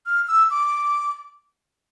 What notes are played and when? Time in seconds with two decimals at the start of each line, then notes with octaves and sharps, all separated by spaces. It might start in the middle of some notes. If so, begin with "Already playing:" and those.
0.06 F6
0.28 E6
0.50 D6